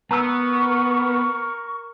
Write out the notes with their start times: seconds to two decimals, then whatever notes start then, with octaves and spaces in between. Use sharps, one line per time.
0.11 B3 A#4 A#5 C#6 E6